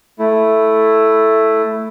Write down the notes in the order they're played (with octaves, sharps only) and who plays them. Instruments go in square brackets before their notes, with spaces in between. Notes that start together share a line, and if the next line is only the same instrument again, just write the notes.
[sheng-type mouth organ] A3 E4